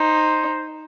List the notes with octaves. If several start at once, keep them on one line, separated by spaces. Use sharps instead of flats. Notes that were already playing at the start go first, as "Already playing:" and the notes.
Already playing: D#4 C5